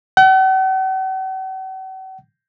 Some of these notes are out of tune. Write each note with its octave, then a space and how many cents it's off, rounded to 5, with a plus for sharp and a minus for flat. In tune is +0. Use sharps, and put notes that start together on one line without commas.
F#5 +45